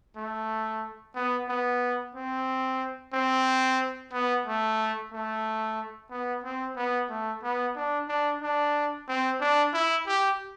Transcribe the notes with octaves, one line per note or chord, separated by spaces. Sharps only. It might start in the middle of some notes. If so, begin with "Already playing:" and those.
A3
B3
B3
C4
C4
B3
A3
A3
B3
C4
B3
A3
B3
D4
D4
D4
C4
D4
E4
G4